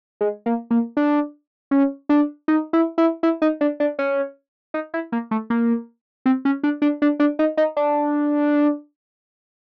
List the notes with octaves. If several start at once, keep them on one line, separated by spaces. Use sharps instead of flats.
G#3
A#3
A#3
D4
C#4
D4
D#4
E4
E4
E4
D#4
D4
D4
C#4
D#4
E4
A#3
A3
A#3
C4
C#4
D4
D4
D4
D4
D#4
D#4
D4